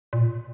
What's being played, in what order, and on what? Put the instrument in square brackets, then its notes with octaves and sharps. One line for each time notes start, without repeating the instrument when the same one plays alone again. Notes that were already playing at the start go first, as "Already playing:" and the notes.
[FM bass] A#2